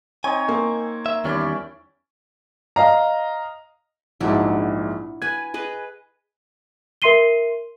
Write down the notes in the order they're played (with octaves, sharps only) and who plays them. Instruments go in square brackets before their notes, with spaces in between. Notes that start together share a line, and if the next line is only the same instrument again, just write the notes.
[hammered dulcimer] C4 D#4 C#5 [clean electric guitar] G#5
[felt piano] A#3
[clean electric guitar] E5
[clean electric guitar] E2 D#3 G3 [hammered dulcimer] C#4 E4 D5
[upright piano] D#5 F5 A#5
[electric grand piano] A#1 G#2 [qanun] F#3 D4 E4
[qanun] B4 G#5 [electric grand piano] G#6
[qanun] G#4 B4 D#5
[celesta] A#4 E5 C6 C7 D#7 G7